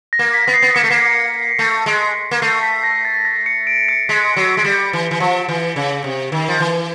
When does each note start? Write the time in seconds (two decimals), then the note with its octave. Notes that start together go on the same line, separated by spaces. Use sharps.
0.13 A#6
0.19 A#3
0.34 B6
0.48 B3
0.54 C7
0.62 B3
0.75 A#3 C#7
0.84 A3
0.90 A#3
1.59 A3
1.86 G#3
2.31 A#3
2.42 A3 C7
2.63 B6
2.84 A#6
3.05 A6
3.25 A#6
3.46 C#7
3.67 D7
3.89 C#7
4.09 G#3 B6
4.36 F#3
4.57 G#3
4.64 G3
4.93 E3
5.11 E3
5.20 F3
5.49 E3
5.76 C#3
6.04 C3
6.32 D#3
6.48 F3
6.60 E3